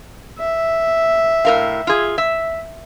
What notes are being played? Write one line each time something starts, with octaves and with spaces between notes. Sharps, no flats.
E5
A2 A#4 F5
F4 G#4
E5